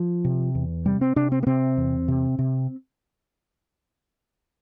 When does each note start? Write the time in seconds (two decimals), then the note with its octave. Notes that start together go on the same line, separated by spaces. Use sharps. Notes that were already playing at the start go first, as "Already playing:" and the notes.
Already playing: F3
0.25 C3
0.55 E2
0.86 C3 G3
1.01 C4
1.16 C3 D4
1.32 C4
1.43 A#3
1.47 C3 C4
1.77 E2
2.08 C3
2.39 C3